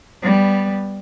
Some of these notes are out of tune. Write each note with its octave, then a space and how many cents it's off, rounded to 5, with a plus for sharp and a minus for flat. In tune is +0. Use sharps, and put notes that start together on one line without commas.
G3 +0 B3 +0